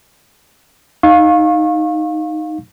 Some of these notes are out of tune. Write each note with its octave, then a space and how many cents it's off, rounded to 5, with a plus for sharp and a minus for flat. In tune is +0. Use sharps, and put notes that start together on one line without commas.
D#4 +0 F5 +15 C#6 -30